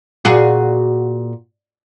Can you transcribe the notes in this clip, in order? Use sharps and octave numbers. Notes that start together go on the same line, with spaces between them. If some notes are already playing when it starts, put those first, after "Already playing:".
A#2 F#4 G#4